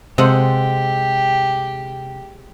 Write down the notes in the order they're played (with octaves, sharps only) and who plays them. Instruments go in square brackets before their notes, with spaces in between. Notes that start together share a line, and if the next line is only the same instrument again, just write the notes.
[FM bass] C3 [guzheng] G#3 A4 F#5 [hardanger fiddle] G4 [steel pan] C5